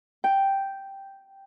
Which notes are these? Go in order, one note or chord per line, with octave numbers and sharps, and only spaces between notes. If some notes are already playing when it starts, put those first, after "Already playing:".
G5